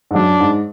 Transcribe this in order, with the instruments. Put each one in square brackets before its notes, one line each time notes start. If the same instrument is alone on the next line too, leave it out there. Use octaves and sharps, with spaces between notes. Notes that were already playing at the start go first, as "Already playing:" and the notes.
[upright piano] G#2
[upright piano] F#2 [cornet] D4
[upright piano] G#2